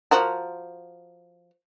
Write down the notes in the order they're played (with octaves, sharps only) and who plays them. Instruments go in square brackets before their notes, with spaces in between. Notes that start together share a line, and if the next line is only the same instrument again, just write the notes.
[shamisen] F3 F#4 A#4